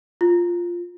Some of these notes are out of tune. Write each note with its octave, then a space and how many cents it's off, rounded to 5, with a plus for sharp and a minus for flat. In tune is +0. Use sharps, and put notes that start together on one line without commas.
F4 +0